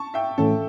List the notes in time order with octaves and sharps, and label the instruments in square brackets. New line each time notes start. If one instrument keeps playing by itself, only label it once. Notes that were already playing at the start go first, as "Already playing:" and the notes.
Already playing: [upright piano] A5 C#6
E5 G5
[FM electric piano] A2 E3 A3 C#4 [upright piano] A4